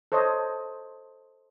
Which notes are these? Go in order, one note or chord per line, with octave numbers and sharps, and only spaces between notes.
A4 C5 C#5 D#5